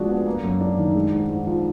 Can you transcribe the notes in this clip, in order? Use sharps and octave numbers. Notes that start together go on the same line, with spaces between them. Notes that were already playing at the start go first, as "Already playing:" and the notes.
Already playing: F3 G#3 D4 F#4
B3
A#3
F#2
D4
D#3
G#3
G#2
G#2
F3